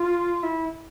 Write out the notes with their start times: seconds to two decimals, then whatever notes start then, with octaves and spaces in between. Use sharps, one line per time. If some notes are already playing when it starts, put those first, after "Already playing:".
Already playing: F4
0.43 E4